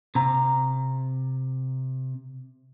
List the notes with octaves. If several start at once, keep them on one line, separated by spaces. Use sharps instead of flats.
C3 A#5